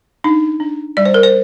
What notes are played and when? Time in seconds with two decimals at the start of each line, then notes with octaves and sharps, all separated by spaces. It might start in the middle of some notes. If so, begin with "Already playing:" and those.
0.24 D4 D#4
0.60 D4
0.97 G3 D5
1.05 C5
1.14 A#4
1.23 C5